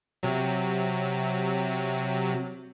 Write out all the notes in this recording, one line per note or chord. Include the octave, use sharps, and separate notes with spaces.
C3 F#3